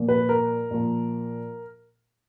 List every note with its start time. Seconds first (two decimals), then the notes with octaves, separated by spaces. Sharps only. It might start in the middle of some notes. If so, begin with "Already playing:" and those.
Already playing: A#2 F3
0.09 B4
0.29 A#4
0.71 A#2 F3